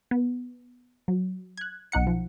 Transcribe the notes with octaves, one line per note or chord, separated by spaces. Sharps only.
B3
F#3
F#6 G#6
B1 D#4 F#5 C#7
F3